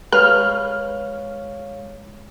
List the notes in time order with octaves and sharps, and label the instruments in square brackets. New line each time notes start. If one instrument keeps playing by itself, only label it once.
[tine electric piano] G#3 C#5 F5 [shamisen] B4 [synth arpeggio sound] F6